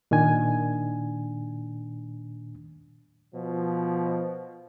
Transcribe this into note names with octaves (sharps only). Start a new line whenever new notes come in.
A#2 D#3 D4 G#5
B2 F3